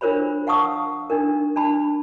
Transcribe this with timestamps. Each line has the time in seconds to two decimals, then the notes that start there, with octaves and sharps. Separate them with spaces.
0.01 D4 F4 A#4 C5 C#5 B5
0.47 F5 F#5 A5 C#6 D#6 E6
1.10 D4 D#4 A#4
1.56 D4 A5 B5